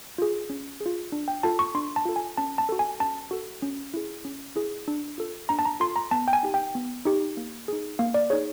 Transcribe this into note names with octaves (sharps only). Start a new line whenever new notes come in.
F4 G#4
C#4
G#4
F4
D4
G5
F4 A4 A5
C#6
D4 C6
A5
F4 A4
G#5
C#4 A5
A5
F#4 A4
G#5
C#4 A5
F#4 A4
C#4
E4 G#4
C#4
E4 G#4
D4
F4 A4
D4 A#5
A5
A#5
F4 A4 C6
A#5
B3 A5
G5
G#5
D#4 G4
G5
B3
D#4 G4
A#3
D#4 G#4
A#3 F5
D5
D#4 G#4 C#5